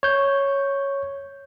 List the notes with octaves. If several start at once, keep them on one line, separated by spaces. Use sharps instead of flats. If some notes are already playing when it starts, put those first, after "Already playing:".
C#5 G6